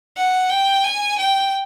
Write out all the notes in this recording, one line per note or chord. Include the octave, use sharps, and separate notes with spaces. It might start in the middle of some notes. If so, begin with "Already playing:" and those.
F#5
G5
G#5
G5